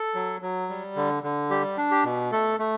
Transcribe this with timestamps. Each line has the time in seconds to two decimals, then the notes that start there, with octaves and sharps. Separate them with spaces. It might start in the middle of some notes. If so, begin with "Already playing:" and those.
Already playing: A4
0.15 F#3
0.42 F#3
0.70 G3
0.96 D3
1.23 D3
1.50 G3 G4
1.78 D4
1.91 G4
2.04 B2
2.32 A3 A4
2.59 A3